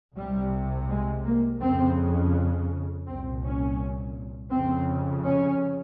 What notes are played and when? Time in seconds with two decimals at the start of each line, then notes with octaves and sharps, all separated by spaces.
0.15 C2 C3 G3
0.89 G#3
1.25 A#3
1.61 F2 C#3 C4
3.06 C2 A#2 C4
3.43 C#4
4.51 F2 C#3 C4
5.24 C#4